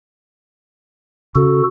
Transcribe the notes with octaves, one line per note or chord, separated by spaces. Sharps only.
C#3 F#4 A4